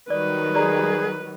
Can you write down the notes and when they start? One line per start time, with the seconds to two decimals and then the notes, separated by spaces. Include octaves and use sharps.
0.10 D#3 F#3 G3 B4 D5
0.55 G#4 D5 A#5